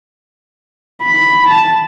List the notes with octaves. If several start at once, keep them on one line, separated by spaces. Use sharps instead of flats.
B5
A5